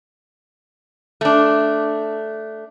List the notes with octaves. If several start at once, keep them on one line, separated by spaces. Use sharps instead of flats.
A3 D4